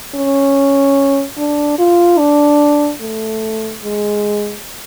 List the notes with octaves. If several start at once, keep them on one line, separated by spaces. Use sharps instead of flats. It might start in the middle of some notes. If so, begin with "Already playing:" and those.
C#4
D4
F4
D4
A3
G#3